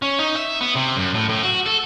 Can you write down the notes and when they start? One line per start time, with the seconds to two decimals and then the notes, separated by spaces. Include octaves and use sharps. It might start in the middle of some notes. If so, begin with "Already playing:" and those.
0.02 C#4
0.19 D#4
0.36 E5
0.61 B3
0.75 C3
0.96 F#2
1.14 A2
1.29 A2
1.43 F#4
1.66 A4